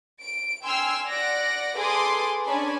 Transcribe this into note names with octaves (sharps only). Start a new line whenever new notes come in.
D7
G5 G#5 C6 E6 F6
D5 F#5 A#6 D7
G#4 A4 B4 C6 D6 D#6
C#4 D4 D5 G#5 A5 B5